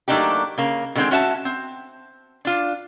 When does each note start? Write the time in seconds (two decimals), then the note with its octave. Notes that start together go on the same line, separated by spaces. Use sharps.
0.08 F#3 A3 A#3 D4 D#4 G4
0.58 C#3 A#3
0.95 B2 D3 D#3 G#3 C4 G#4
1.11 C#4 F#4 E5 A5
1.45 C4
2.45 D4 F4